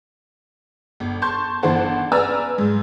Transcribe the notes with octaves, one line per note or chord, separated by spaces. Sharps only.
G1
A5 C6 C#6 G6
G1 E3 D4 C5 F#5 A5
B4 D5 G#5 A#5 E6 F6
G#2